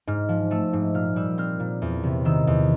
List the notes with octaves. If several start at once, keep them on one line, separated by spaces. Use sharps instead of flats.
G#2 F6
F3
A3 E6
G#2
A#2 F6
G3 E6
C4 F6
A#2
E2
C3
D#3 E6
E2